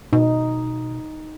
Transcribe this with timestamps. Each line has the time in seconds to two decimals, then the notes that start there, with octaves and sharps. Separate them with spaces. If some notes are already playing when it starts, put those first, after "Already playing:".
0.13 B2 D#4